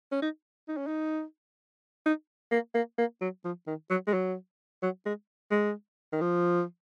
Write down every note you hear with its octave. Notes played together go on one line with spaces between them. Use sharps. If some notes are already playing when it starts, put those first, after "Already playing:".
C#4
D#4
D#4
C#4
D#4
D#4
A#3
A#3
A#3
F#3
F3
D#3
F#3
G#3
F#3
F#3
G#3
G#3
D#3
F3